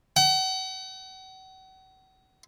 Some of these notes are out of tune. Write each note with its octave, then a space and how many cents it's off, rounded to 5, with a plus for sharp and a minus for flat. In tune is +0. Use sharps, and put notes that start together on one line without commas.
F#5 +40